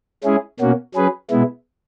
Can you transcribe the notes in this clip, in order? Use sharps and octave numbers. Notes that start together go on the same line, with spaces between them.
G#3 C#4 E4 G#4
B2 A#3 C#4 F#4
F#3 C#4 G#4 B4
B2 G#3 B3 E4